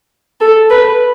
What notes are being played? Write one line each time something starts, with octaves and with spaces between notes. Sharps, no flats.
A4
B4